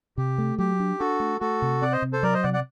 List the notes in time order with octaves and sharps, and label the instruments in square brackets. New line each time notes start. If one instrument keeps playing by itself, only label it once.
[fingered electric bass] C3 [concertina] G4
[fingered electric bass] A3
[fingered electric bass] F#3 [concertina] G4
[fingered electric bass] D4
[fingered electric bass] D4 [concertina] F#4 A4
[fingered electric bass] A3
[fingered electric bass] A3 [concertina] F#4 A4
[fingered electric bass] C3
[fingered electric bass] C4 [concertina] D5 F#5
[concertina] C5 D#5
[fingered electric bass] C3
[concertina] A4 C5
[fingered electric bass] F#3 [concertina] A#4 D5
[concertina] C5 D#5
[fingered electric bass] C3 [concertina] D5 F#5
[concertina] D5 F#5